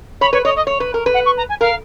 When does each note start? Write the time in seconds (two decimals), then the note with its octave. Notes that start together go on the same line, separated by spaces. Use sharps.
0.21 C#5 B5
0.33 B4 C#5
0.44 C#5 D#5
0.56 D#5
0.67 C#5
0.80 B4
0.94 A#4
1.06 B4
1.14 F#5
1.25 C#6
1.37 A#5
1.49 G#5
1.60 A#4 F5